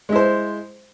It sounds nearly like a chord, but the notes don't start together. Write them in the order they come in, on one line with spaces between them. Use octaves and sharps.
G#3 E4 C5